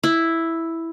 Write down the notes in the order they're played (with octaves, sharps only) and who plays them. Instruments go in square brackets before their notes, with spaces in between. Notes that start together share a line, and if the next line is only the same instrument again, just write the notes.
[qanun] E4